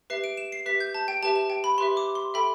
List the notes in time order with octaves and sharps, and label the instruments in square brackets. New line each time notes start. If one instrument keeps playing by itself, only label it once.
[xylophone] G4 B4 E5 C7
D7
E7
C7
G4 B4 E5 B6
G6
A5
G5
G4 B4 E5 A5
A5
G5
B5
G4 B4 E5 C6
D6
C6
A4 E5 G5 B5